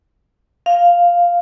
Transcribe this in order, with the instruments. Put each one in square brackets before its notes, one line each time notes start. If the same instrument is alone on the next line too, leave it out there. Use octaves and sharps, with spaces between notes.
[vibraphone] F5